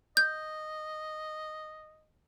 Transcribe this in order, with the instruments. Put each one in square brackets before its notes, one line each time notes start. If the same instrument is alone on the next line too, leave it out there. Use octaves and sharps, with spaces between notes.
[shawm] D#5 [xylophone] G6